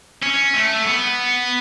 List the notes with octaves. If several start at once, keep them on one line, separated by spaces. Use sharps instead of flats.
C#4
A3
B3